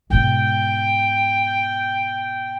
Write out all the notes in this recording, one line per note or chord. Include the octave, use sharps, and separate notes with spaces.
G#2 B2 G5